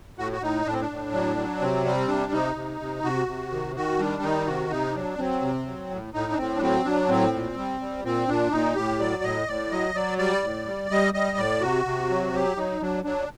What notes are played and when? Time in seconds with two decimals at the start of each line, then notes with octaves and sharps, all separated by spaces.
0.18 A2 F#4
0.32 F#4
0.41 A2 D#4
0.66 A2 D4
0.73 C4
0.81 D4
0.90 A2
1.13 F#3
1.37 F#3
1.60 C3 C4
1.85 G3 C4
2.08 C3 D4
2.32 C3 D#4
2.56 C3
2.80 C3
3.03 C3 F#4
3.27 C3
3.52 D#3
3.75 D#3 F#4
3.99 G3 D4
4.22 D#3 D#4
4.47 C3 F#4
4.70 C3 D#4
4.95 F#3 D4
5.18 F#3 C4
5.42 C3
5.66 F#3
5.90 A2
6.13 A2 D#4
6.32 D4
6.37 A2 C4
6.57 D4
6.61 F#3 C4
6.85 F#3 D4
7.09 A2 C4
7.33 A#2
7.57 G3
7.81 G3
8.04 A#2 C4
8.28 A#2 D4
8.51 A#2 D#4
8.76 A2 G4
8.99 F#3 D5
9.23 A2 D#5
9.48 A2 D5
9.71 F#3 D#5
9.95 F#3 D5
10.18 G3 D5
10.43 A2
10.66 G3
10.91 G3 D#5
11.14 G3 D#5
11.37 A2 D5
11.61 C3 F#4
11.85 C3
12.10 F#3
12.33 F#3 G4
12.57 F#3 D#4
12.81 F#3 D4
13.04 F#3 D4